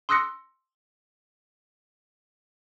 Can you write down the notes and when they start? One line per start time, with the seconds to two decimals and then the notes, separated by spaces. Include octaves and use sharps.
0.09 C6 D#6 E6 F#6 A#6 C#7